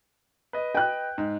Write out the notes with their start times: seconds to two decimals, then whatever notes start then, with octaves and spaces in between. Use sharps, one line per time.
0.53 B4 D#5
0.75 G5 F#6
1.18 G#2